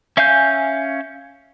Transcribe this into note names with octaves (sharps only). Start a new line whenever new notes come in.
C#4 E5 F5 G#5 G6